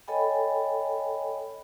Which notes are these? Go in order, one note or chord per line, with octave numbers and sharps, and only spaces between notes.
A4 C#5 D#5 G5 G#5 B5